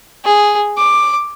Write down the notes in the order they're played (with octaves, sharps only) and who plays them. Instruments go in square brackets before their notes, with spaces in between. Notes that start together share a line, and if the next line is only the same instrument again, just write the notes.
[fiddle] G#4
D6